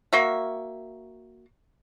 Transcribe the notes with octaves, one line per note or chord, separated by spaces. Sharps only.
A#3 F#4 E5